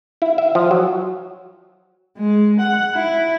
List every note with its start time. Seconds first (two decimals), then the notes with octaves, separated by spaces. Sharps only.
0.22 E4
0.38 E5
0.55 F3
0.71 F#3
2.18 G#3
2.60 F#5
2.95 E4